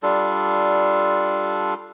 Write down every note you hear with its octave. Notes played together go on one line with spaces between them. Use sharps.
G3 D4 F4 A4